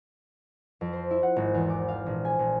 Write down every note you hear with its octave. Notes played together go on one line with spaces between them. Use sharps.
F2
C5
E4
F#5
G#1
E2
D6
F5
A#1
G#5
A#1